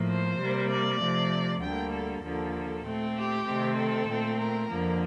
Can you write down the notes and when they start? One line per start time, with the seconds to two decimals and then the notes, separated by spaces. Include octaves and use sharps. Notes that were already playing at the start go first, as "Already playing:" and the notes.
Already playing: A2 F3 A#3
0.08 C5
0.39 C3 G3 A#3
0.70 D5
1.01 C3 F3 A3
1.62 D2 D3 G3 A#3 G5
1.92 A4
2.22 D#2 D3 F3 A#3 A4
2.84 A#2 A3 C4
3.15 G4
3.46 C3 D#3 A3 C4
3.76 A4
4.07 A#2 A3 C4
4.38 A#4
4.69 F2 D3 F3 A#3